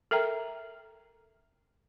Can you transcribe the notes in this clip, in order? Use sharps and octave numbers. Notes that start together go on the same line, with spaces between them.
A4 A#4 E5 G5 A#5